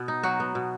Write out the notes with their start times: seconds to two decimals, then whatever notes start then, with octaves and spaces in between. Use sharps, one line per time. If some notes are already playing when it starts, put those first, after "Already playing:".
Already playing: B2 B3
0.08 D#4
0.23 F#3 F#4
0.40 B3
0.55 B2